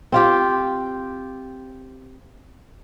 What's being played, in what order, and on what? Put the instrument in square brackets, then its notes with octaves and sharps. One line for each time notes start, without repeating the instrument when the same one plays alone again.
[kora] C4 F4 G4